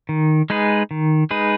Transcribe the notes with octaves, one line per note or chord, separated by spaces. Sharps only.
D#3
G#3 D#4 G#4 B4
D#3
G#3 D#4 G#4 B4